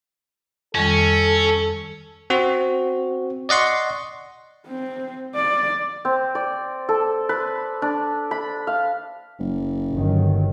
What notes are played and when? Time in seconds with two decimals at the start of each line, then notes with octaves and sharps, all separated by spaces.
0.75 F2 D#3 G3 C#4 A4
2.30 C4 F#4
3.49 D5 D#5 F#5 C6 C#6
4.67 C4
5.36 D5
6.05 C4
6.35 D5
6.89 A4
7.29 B4
7.82 D4
8.31 B5
8.67 F5
9.39 F#1
9.92 G1 D#3 F#3